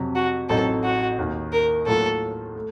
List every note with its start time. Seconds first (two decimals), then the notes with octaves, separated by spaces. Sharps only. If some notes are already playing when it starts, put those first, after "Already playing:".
Already playing: F2 C3 F#3
0.15 F#4
0.49 A1 A2 F#3 C4 D#4 A4
0.84 F#4
1.18 D#2 D#3 A#3
1.52 A#4
1.86 A2 F#3 A#3 F4 A4
2.55 A3